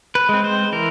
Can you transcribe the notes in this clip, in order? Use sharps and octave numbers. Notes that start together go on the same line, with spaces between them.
B4
G#3 C4
C5
E3 A#4